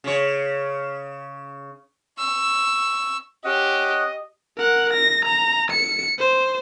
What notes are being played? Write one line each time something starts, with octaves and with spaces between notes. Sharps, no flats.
C#3 C#5
C#6 E6
C#4 G4 D#5 F#5
A#4 F#5
A#6
A#5
C#7
C5